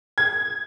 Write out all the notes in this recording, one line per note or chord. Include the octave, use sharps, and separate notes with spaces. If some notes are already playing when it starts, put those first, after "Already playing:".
G#6